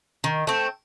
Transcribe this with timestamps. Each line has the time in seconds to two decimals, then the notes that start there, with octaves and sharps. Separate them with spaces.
0.24 D#3
0.47 A3 C4